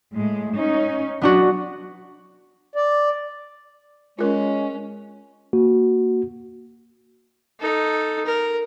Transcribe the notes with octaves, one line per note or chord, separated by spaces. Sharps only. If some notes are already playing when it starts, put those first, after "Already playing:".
A2 G#3
C#4 D#4
F#3 B3 D4 F#4
D5
G#3 C#4 F4 A#4
A#3 F#4
D#4 A4
A#4